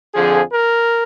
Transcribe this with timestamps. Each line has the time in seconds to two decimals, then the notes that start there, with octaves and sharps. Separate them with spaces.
0.14 F2 D3 F3 G#4
0.53 A#4